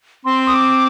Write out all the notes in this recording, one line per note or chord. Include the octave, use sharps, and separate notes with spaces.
C4 C6
D#6
D6